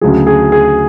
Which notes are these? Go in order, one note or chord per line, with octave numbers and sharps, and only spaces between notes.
D2 C#3 F#3 G#4
G#4
G#4